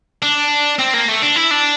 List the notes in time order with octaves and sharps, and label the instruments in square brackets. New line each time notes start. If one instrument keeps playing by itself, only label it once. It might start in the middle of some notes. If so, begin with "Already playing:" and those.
[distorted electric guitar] D4
C4
A#3
A3
D4
E4
D4